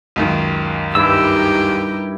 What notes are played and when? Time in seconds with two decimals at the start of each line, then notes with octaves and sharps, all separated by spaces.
0.16 C#2 F#2 D#3
0.95 G2 D#4 E4 G4 A#4 E6